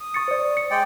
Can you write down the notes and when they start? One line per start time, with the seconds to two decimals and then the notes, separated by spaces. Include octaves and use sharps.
0.01 D#6
0.14 C#6 A6 C#7
0.28 C5 D5
0.57 C#7
0.71 G#3 D5 G5